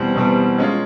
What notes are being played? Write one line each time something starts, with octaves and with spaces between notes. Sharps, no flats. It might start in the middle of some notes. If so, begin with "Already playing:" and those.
Already playing: E2 B2 G3 C4
E2 B2 G3 C4
G#3 C#4 F4